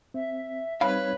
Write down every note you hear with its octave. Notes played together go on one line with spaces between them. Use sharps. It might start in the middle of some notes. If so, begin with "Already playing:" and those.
C4 E5
G3 C4 D#4 B4 C#5 F5 B5